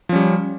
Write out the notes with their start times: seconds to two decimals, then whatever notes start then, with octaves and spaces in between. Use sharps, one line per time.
0.09 F3
0.12 C#4
0.16 G3